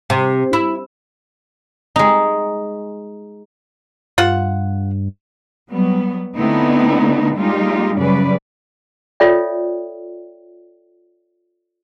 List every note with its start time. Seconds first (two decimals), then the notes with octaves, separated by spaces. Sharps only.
0.10 C3
0.53 E4
1.96 G#3 D#4
4.18 G2 F4 F#5
5.70 F#3 G3 B3
6.36 D3 A3 B3 C4 D#4 E4
7.36 G3 G#3 A#3 D#4 F4 G4
7.97 F#2 C#3 F#3 G3 B4 D5
9.20 F4 A4 C#5 D5 E5 G5